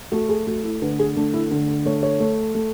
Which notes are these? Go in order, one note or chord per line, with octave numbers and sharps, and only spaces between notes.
A3 F#4
G#4
A3 F#4
E4
D3 B4
G#4
A3 D4
E4
D3 A4
A4
A3 C#5
C#5
A3
A3